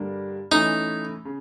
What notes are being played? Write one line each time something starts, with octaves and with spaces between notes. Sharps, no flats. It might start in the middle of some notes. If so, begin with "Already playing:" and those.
Already playing: G2 D3 G3 A#3 D4
E3 A3 C#4 D#4 E4
C#3